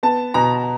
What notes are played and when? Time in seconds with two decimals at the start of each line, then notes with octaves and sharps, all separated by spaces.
0.03 B3 A5
0.34 B2 A#5